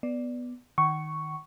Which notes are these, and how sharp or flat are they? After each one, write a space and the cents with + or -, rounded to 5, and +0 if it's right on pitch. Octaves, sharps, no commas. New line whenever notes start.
B3 +0 D5 +0
D#3 +0 F#5 +40 C#6 +0